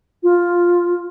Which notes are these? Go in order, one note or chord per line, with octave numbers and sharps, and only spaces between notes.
F4